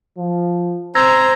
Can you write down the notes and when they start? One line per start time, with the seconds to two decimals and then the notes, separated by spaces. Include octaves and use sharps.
0.18 F3
0.95 C4 C5 A#5 E6 G#6 A#6